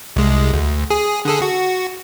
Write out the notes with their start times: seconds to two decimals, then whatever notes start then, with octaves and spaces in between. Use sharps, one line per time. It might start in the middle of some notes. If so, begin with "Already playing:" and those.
0.16 C2 G#3
0.54 D2
0.90 G#4
1.25 D3 G#4 A4
1.42 F#4